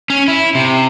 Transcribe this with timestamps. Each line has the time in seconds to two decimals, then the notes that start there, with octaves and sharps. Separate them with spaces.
0.10 C#4
0.28 E4
0.55 C3